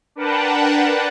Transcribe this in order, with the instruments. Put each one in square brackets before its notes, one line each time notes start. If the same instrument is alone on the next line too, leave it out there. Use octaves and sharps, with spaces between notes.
[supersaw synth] D4 A#4 B4 F#5 G5 A5